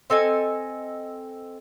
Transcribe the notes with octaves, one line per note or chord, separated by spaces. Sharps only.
C4 A4 D#5 G#5